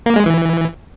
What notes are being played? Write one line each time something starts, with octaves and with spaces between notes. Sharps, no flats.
A#3
G#3
E3